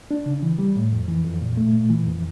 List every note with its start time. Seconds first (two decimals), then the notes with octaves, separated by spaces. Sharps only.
0.11 D4
0.26 C#3
0.42 E3
0.59 G3
0.76 A2
0.93 F2
1.08 E3
1.24 F2
1.41 A#2
1.57 A3
1.73 A#2
1.90 E3
2.06 F2